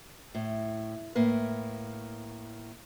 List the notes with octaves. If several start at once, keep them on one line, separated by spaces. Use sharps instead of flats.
A2
A2 A#3 B4